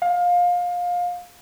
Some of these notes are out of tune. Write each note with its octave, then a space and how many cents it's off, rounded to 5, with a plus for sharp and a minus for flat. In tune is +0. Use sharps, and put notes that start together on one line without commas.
F5 +25